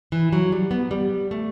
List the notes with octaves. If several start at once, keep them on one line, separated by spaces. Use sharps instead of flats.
E3
F#3
G3
B3
G3
A3